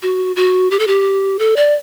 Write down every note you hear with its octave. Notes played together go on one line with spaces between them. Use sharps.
F#4
F#4
G4
A4
G4
A4
D5